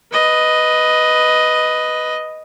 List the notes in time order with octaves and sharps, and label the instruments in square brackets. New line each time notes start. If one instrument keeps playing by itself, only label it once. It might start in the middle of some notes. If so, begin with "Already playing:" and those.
[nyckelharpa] B4 D#5